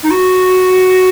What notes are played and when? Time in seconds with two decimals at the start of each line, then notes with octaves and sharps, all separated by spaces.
0.03 D#4
0.11 F#4